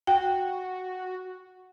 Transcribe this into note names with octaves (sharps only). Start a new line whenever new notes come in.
F#4 G5